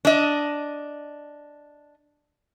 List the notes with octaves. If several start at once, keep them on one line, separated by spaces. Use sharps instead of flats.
D4 D#5